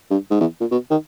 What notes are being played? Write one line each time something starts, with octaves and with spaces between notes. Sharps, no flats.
G2
G#2
E2
A#2
B2
D#3